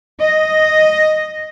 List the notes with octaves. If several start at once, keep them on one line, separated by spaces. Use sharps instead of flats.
D#5